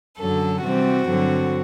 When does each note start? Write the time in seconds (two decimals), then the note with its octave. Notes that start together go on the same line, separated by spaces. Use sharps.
0.19 F#2 D3 F#3 A4
0.63 C3 E3 G3 C4 F#4
1.07 G2 D3 F#3 C4